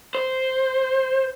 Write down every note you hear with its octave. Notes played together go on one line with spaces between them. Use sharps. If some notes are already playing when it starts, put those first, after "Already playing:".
C5